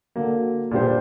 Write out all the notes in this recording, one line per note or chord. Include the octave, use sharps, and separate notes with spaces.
D3 F#3 A#3
A#2 G3 D4 G4 C5